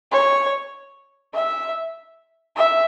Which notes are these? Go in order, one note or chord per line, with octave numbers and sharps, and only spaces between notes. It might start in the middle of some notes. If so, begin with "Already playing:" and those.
C#5
E5
E5